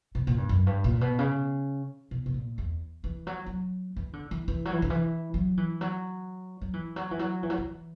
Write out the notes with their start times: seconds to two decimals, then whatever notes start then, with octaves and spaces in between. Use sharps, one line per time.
0.15 B2
0.27 A#2
0.38 G2
0.49 F#2
0.66 G2
0.84 A#2
1.01 B2
1.19 C#3
2.11 B2
2.26 B2
2.34 A#2
2.58 E2
3.04 E3
3.27 F#3
3.46 F#3
3.96 E3
4.13 D3
4.31 E3
4.48 E3
4.65 F#3
4.73 E3
4.82 D3
4.90 E3
5.34 F#3
5.57 E3
5.81 F#3
6.61 F#3
6.73 E3
6.96 F#3
7.11 E3
7.19 F#3
7.43 E3
7.50 F#3
7.58 E3